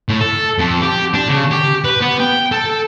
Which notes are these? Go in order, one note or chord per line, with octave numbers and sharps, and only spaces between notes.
A2
A4
F2
G4
D4
C#3
G4
B4
B3
G5
A4